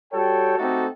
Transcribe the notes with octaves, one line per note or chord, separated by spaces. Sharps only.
G3 F#4 A4 C#5 G5
A3 C4 D#4 F#4 G4 A4